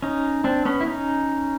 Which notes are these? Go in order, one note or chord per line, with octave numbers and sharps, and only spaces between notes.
C#4 D#4
C4 D4
B3 C#4
E4
C#4 D#4